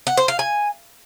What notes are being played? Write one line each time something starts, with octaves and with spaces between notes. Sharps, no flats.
F#5
C5
F5
G#5